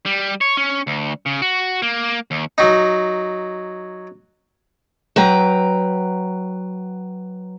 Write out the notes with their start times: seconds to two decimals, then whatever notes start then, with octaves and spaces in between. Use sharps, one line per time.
0.06 G3
0.41 C#5
0.57 C#4
0.87 D2
1.26 C#3
1.42 F#4
1.82 A#3
2.31 D#2
2.58 F#3 D#4
5.16 F#3 B4 G5 A#5